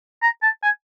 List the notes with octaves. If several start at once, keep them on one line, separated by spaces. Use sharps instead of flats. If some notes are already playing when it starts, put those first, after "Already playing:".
A#5
A5
G#5